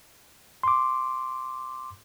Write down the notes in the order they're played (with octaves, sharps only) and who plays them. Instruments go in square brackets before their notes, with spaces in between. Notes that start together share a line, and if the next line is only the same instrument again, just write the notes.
[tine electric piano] C6 D6